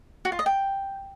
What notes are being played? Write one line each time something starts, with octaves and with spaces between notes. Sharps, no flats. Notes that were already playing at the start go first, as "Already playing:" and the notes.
F#4
F4
D#5
G5